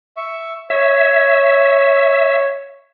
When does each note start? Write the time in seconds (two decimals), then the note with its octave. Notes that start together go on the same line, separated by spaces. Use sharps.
0.17 E5 C#6
0.70 C#5 E5